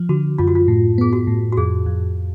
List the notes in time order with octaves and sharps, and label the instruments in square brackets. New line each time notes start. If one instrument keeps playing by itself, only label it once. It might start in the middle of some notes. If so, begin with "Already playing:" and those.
Already playing: [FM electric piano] F3
[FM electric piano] D3 [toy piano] F#4
[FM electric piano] F#2 [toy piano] F4
[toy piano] F#4
F4
[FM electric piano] A2
[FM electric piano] B3 [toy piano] G#4
[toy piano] F#4
[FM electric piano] A2
[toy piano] F#4
[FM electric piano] F2 [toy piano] G#4
[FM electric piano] F2